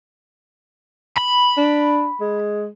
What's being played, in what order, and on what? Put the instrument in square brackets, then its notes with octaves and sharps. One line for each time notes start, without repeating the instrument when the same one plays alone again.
[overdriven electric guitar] B5
[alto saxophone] D4
G#3